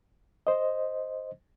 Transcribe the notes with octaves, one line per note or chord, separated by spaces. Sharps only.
C5 D#5